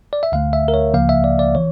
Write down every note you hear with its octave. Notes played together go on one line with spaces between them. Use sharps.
D5
E5
D2 D3 A3 F5
E5
A#4
C#5
C#2 C#3 F3 A#3 F5
E5
D5
D5
E3 C#5